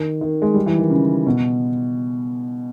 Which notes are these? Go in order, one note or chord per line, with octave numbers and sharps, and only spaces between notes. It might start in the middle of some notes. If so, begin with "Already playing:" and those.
Already playing: D#3
D#3
G#3
G3
E3
D#3
C#3
B2